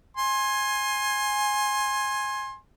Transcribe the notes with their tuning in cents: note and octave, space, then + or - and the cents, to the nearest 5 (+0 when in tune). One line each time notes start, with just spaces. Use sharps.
G#5 +0 C6 +25